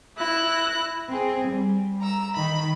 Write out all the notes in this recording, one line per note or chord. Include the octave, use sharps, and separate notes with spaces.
E4 F#6 A#6
C4 G#4
G3
A#5 E6
D#3 B5